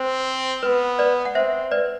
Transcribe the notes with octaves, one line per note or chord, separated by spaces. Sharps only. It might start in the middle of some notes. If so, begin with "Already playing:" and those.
Already playing: C4 C5
B3 B4
B4 D5
F#5
C4 C5 E5
B4 D5